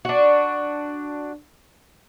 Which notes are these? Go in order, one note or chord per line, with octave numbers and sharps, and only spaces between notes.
D4 F#4